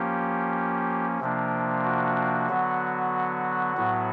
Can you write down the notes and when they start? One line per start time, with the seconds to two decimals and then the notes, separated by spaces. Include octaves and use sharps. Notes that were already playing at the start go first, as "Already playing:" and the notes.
Already playing: F3 A#3 C#4 G4
1.20 C3 F3 A#3 D4
1.84 F#4
2.49 D3 F#3 B3
3.77 A2 F#3 B3